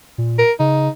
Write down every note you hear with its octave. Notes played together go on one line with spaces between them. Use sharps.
A#2
A#4
C#3 D#4